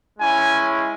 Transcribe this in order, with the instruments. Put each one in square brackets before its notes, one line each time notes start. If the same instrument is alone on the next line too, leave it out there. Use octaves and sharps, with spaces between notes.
[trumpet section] G#3 C#4 E4 G#5